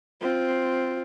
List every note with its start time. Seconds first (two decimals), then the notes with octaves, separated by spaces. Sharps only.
0.21 C4 F4